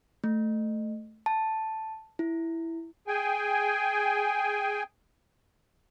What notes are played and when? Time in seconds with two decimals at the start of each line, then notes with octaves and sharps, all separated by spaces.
0.24 A3
1.26 A5
2.19 E4
3.07 G#4 G5 G#5